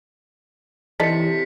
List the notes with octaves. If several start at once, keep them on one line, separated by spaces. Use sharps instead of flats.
C3 E3 D#4 A4 D5 B6 C#7